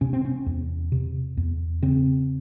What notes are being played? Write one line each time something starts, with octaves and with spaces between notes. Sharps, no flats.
C3 C#4
C4
C#4
E2
C3
E2
C#3 C4